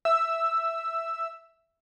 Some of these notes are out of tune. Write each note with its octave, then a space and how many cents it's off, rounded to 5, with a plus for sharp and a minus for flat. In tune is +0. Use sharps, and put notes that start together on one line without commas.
E5 +0 E6 +0